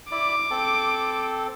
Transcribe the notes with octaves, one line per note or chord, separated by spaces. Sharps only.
E4 D5 D6
C4 A4